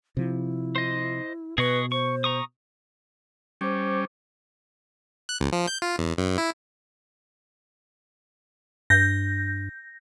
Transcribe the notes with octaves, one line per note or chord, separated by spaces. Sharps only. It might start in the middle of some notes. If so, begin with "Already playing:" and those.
C3 F3 E4
C5 D#5
B2 G#4 B4 D#5 C#6
C5 C#6
A#5 C#6 D#6
G3 C#4 C5 D6
F#6
C#2
F3
G6
F4
E2
F#2
E4
G2 G6 A#6